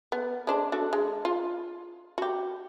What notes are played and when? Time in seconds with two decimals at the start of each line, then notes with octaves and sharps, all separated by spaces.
0.12 B3
0.47 G#3 D4 C5
0.72 D4 F#4 A4
0.93 G#3
1.25 F4
2.18 F#4 G4